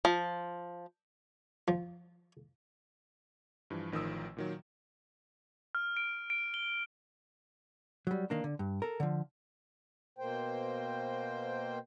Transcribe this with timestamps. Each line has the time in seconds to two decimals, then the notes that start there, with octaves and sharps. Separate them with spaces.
0.05 F3
1.68 F3
3.70 G2 E3 F3
3.92 A1 D#3 F3 D#6 E6
4.37 A#2 D#3 F#3
5.75 F6
5.97 D7
6.30 D7
6.54 G7
8.07 F#3 G3
8.30 D#3 A#3 D4
8.44 D3
8.59 G2
8.82 A4 A#4
9.00 D3 F3
10.19 B2 A#3 C5 G5